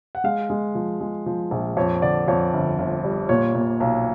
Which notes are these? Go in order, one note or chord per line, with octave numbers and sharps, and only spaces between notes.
F#5
G#3 F5
G#3
F3
G#3
F3
A#1
F2 C#5
D3 D5
F2 C#5
G1
G1
G3
A#2 C#5
A#2
B1